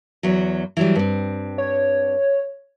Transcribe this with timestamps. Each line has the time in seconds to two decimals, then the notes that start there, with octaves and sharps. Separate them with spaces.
0.23 E2 F#3
0.77 E3 F#3 G3
0.96 G2 C4
1.58 C#5